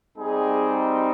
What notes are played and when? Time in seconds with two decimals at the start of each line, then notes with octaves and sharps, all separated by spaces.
0.15 G3 C4 D#4 G#4